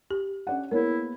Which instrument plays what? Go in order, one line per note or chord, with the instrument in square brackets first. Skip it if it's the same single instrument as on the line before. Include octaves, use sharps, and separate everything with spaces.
[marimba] G4
[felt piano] C#4 D5 F#5
[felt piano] A#3 B3 G#4 [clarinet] E4 [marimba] A#4 C#5